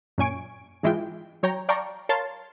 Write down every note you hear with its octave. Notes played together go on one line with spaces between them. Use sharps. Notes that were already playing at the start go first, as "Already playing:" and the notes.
F#2 A#2 C#4 G#5 C#6 D7
G#2 E3 G#3 E4 F4 G5
F#3 C#5 G5 A#5
D5 F5 G5 A5 A#5 C#6
A#4 C#5 F5 A5 C6 A6